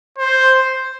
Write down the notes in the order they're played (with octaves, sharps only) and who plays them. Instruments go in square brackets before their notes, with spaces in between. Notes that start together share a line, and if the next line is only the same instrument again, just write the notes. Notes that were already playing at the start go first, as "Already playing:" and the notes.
[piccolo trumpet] C5